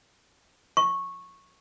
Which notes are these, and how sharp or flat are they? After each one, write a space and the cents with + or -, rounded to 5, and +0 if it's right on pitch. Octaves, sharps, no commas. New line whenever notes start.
C#6 -10